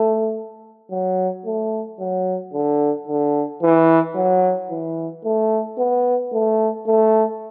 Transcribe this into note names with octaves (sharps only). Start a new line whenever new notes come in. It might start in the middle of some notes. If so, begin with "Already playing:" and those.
Already playing: A3
F#3
A3
F#3
D3
D3
E3
F#3
E3
A3
B3
A3
A3